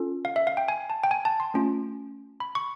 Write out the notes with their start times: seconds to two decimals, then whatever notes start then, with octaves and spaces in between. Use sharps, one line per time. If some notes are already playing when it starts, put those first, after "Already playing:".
Already playing: C#4 F4 A4
0.25 F5
0.36 E5
0.47 F5
0.57 G5
0.68 G#5
0.90 A5
1.04 G5
1.11 G#5
1.25 A5
1.40 C6
1.54 A3 C#4 F4
2.40 B5
2.55 C#6